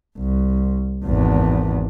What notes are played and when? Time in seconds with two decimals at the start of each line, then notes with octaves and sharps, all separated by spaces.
0.18 C2
1.05 G#1 E2